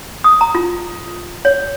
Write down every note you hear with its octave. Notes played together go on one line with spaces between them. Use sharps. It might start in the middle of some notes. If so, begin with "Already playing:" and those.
D#6
A#5
F4
C#5